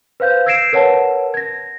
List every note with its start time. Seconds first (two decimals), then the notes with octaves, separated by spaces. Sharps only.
0.20 B4 C5 F5 G6
0.46 E6 G#6 A#6 C7 D7 E7
0.73 A#4 B4 C#5 F#5 A5
1.34 G#6 A#6